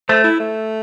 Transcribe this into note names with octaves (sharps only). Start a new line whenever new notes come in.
A3 C5
E4
A3